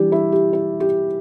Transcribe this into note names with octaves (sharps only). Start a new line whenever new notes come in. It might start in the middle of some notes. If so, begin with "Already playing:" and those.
Already playing: E3 G3 D4 G4 D5
E4
G4
E4
G4